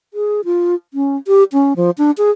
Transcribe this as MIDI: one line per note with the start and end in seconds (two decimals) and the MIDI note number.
0.14 0.41 68
0.45 0.75 65
0.94 1.17 61
1.27 1.44 67
1.53 1.73 61
1.76 1.91 53
1.98 2.11 62
2.18 2.31 68